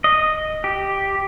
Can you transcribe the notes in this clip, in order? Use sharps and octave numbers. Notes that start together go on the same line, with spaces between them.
D#5
G4